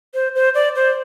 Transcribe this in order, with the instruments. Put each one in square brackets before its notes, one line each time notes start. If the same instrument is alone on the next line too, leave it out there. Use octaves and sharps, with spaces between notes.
[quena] C5
C5
D5
C5